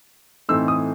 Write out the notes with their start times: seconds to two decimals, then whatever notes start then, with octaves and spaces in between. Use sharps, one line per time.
0.49 A2 E3 A3 C4 D#4 E6
0.68 D#6